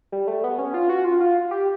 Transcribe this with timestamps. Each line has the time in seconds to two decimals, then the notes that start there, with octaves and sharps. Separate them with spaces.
0.12 G3
0.28 A3
0.44 B3
0.59 C#4
0.74 F4
0.89 F#4
1.05 F4
1.20 F4
1.51 G4